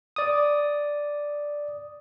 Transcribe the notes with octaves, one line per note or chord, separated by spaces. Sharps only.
D5 D#6